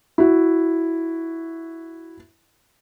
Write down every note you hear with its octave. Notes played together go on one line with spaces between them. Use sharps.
E4 F#4 E5